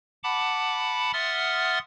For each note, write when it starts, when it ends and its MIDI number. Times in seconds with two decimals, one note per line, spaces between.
0.24 1.11 78
0.24 1.11 81
0.24 1.11 83
0.24 1.11 86
1.13 1.79 76
1.13 1.79 78
1.13 1.79 84
1.13 1.79 87
1.13 1.79 89
1.13 1.79 93